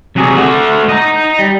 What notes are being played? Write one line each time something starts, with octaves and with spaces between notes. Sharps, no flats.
C3 F#3 G#4 D5
A3 F#4 D5
D#5 A#5
G3